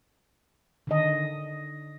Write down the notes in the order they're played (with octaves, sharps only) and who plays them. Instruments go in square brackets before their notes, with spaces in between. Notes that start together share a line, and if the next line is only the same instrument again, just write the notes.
[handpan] D3 D#3 D#5